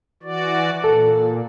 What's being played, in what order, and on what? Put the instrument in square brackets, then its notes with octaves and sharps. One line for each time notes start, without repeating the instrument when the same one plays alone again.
[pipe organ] E3 F#4 D5
[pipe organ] A#2 [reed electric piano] A4